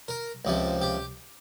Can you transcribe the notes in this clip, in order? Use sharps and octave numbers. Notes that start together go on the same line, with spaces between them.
A#4
C#2 C3 F3
G4